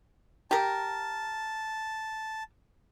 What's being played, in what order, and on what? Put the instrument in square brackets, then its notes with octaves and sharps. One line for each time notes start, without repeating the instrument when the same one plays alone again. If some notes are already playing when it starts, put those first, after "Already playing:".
[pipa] G4 A#4 [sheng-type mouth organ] A5